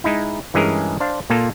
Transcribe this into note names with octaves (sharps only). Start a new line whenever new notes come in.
G#3 D#4 E4
G2 E3 G#3 C#4 G#4 A#4
D4 C5 F5
A#2 A#3 F4 A4